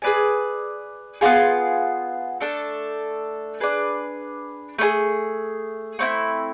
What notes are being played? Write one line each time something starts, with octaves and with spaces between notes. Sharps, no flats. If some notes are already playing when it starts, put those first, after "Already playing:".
G#4 B4 D5 G#5
B3 D4 F4 G#4
A3 D4 A4
D4 G#4 B4
A3 D4 G#4
A3 C4 E4